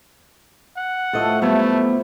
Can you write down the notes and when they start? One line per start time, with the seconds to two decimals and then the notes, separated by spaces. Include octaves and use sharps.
0.77 F#5
1.13 A2 F3 A3 A4 D#5
1.42 C3 F#3 G3 A3 B3 C#5